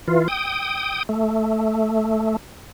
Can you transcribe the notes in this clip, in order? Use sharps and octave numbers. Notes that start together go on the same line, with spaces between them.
E3 F4
G5 D#6
A3